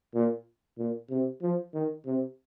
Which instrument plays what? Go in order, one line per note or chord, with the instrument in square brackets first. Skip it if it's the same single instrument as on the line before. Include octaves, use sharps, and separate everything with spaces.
[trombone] A#2
A#2
C3
F3
D#3
C3